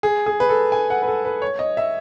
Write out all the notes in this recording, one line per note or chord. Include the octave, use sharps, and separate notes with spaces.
G#4
G#4
B4
A4
G#5
F#5
B4
A4
B4
C#5
D#5
E5